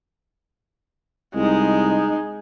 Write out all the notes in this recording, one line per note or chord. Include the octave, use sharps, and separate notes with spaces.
C2 G#3 D#4